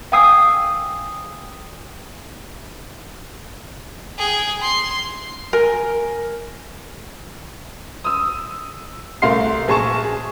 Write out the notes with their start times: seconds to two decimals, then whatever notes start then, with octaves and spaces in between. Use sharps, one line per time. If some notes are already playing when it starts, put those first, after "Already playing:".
0.12 F5 G5 G#5 D#6 E6 C7
4.18 G#4 G5
4.61 C6
5.53 A#4 G#5
8.04 D#6 E6
9.22 C2 A3 A#4 F5 C6 C7
9.68 A#1 G#4 A5 C#6 E7
10.04 G#4